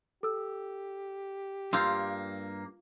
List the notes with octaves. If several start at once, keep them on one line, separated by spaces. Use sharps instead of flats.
G4 A4 E6
G2 A#3 F4 E6 G6 C7